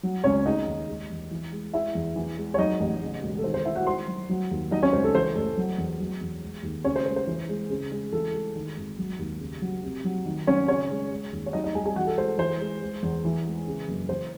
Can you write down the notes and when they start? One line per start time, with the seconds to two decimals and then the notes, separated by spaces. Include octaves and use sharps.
0.03 F#3
0.24 C#2 C#4 C#5
0.45 G#3 D#4 D#5
0.67 D#2
0.89 G#3
1.10 E2
1.31 E3
1.52 G#3
1.74 G#3 E4 E5
1.95 E2
2.16 E3
2.37 G#3
2.54 C#5
2.58 F#3 D#4 D#5
2.80 A1
3.02 C#3
3.22 E1
3.38 A4
3.44 D#3 C5
3.54 C5
3.65 G#3 E4 E5
3.75 F#4 F#5
3.87 D#3 C5 C6
4.08 F#3
4.29 F#3
4.51 D#2
4.71 F#3 D#4 D#5
4.82 C#4 C#5
4.93 C#2 C5
5.04 A4
5.14 E3 C5
5.35 A1 A4
5.57 F#3
5.78 E2
6.00 F#3
6.21 E2
6.42 G#3
6.63 D#2
6.84 C#3 C#4 C#5
6.96 C5
7.06 G#3 C5
7.16 C5
7.27 E3
7.49 G#3
7.70 C#3
7.91 G#3
8.12 E3 A4
8.34 G#3
8.56 D#3
8.77 G#1
8.98 F#3
9.19 D#2
9.40 C#3
9.62 F#3
9.83 C3
10.04 F#3
10.26 D#3
10.47 F#3 C#4 C#5
10.68 C#3 C#4 C#5
10.90 G#3
11.11 G#3
11.33 D#2
11.46 C#5
11.53 F#3 D#4 D#5
11.64 D#4 D#5
11.75 C2 G#4 G#5
11.85 G#4 G#5
11.96 E3 F#4 F#5
12.07 A4
12.17 G#3 C5
12.38 E3 C5
12.60 G#3
12.82 G#3
13.02 E2
13.25 E3
13.45 G#3
13.67 C#3
13.88 F#1
14.09 E3 C5